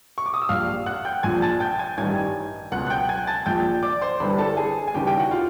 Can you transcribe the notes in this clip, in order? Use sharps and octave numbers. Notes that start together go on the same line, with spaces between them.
C#6
D6
D#6
E6
A#1 A#2 G3 F5 F6
F#5 F#6
G5 G6
A#1 A#2 F3 G#5 G#6
A5 A6
G5 G6
G#5 G#6
A1 G2 D#3 G3 G#5 G#6
C#2 B2 F#3 F#5 F#6
F#6
G5 G6
G#5 G#6
A5 A6
A#1 A#2 F3 G5 G6
D5 D6
C5 C6
G1 G2 E3 G3 B4 B5
A4 A5
G#4 G#5
G#5
D#2 C#3 E3 G3 G4 G5
G4 G5
F#4 F#5
F4 F5